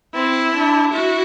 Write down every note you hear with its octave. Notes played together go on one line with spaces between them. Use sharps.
C4 E4
D4
E4 F#4